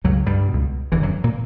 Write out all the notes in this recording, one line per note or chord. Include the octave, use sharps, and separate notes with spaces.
C#2 F#2 B2 F#3
G2 G3
C#2 B2
E1 E2 D3 E3
F#2 F#3
A#2 A#3